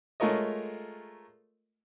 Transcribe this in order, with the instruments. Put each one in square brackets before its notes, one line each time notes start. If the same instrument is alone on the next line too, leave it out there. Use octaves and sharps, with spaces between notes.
[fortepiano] G#3 A3 F4 A#4 C#5 D#5